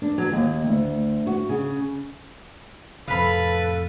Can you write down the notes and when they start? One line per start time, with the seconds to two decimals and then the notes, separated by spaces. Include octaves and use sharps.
0.02 D4
0.18 F#3
0.32 D#2
0.66 D2
1.27 F#4
1.49 C#3
3.08 F2 A2 C3 A4 B4 F5 B5